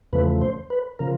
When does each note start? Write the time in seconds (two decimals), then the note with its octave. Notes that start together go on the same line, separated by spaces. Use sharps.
0.13 E2 C#3 F3 A3 B4
0.41 C5
0.70 B4
0.99 C#3 F3 A#4